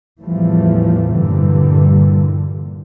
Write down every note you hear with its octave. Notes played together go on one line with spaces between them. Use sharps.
E2 A2 E3 F3 G3 A3
G2 A#2 D3 E3 G3